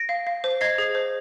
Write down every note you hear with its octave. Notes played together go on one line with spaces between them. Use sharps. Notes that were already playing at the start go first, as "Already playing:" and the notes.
Already playing: A#6 D7
F5
F5
C5
D#5 G#6 C7
G#4
C5